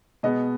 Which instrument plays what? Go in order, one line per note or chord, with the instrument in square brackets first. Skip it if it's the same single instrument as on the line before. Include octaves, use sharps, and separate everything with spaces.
[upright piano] B2 G#3 B3 D#5